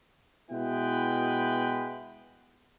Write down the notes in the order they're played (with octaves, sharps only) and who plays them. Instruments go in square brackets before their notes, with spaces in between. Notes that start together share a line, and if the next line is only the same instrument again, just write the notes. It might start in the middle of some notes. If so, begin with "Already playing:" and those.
[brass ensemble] B2 G#3 B3 E4 B4 G5